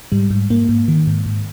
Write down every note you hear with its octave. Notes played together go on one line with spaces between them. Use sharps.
G#2 G3
G#2
G#2 A#3
G#2
D#3
G#2
G#2